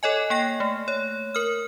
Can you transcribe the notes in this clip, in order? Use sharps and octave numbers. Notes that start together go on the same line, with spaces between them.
A4 C#5 D#5 G#5
A#3 G5 A#6
A3
C#5
A#4 F6